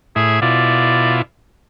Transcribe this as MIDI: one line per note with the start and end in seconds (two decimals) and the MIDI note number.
0.16 0.40 45
0.16 0.40 64
0.16 0.39 68
0.42 1.22 47
0.42 1.22 64
0.42 1.22 65
0.42 1.18 74